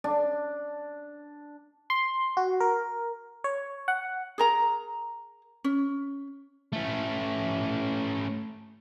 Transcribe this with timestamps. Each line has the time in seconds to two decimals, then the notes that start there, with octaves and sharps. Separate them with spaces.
0.04 D4
1.90 C6
2.37 F#4
2.60 A#4
3.44 C#5
3.88 F#5
4.38 G#4 A#4 A#5
5.64 C#4
6.72 A3 C#4